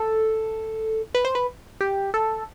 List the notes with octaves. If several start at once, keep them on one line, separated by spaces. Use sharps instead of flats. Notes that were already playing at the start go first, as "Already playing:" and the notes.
Already playing: A4
B4
C5
B4
G4
A4